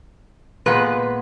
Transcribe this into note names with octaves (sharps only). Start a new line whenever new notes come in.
A#2 G#3 B3 B4